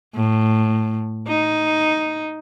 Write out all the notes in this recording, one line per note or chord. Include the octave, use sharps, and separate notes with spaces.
A2
D#4